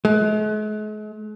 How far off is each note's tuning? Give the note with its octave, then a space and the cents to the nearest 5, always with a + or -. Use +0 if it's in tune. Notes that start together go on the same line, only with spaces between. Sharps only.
G#3 +45